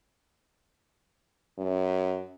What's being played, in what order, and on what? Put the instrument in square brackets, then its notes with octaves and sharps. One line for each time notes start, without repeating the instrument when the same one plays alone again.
[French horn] F#2